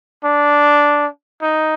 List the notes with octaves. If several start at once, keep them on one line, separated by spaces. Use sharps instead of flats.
D4
D#4